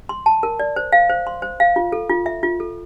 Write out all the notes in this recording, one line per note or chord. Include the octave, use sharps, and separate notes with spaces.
C6
A5
A#4
D5
C5
F5
C5
C6
C5
F5
F4
A4
F4
E5
F4
A4